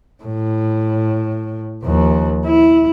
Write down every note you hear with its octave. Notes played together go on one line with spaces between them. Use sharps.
A2
D#2 F3
E4